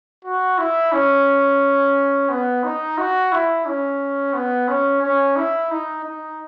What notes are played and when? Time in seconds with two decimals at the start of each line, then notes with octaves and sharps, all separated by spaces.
0.25 F#4
0.58 E4
0.92 C#4
2.29 B3
2.64 D#4
2.98 F#4
3.32 E4
3.66 C#4
4.34 B3
4.68 C#4
5.03 C#4
5.36 E4
5.71 D#4
6.05 D#4